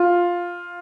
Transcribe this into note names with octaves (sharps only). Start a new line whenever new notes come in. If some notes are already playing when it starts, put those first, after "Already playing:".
Already playing: F4